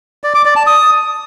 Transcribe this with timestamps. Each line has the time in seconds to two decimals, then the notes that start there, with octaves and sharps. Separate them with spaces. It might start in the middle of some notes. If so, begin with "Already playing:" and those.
0.24 D5
0.34 D6
0.45 D5
0.56 A5
0.67 D#6